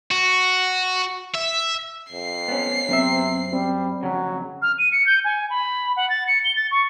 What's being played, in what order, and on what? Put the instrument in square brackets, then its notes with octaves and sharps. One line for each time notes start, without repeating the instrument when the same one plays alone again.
[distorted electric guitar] F#4
E5
[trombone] F2 [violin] C7
[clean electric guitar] B3 C#4
[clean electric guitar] F#2 [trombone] C3 [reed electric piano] B3 C4 E5
[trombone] G3 [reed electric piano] C4
[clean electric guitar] F2 C#3 [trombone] F#3
[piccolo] F6
D#7
C#7
G6
G#5
B5
F#5
A6
C#7
G7
A6
C#6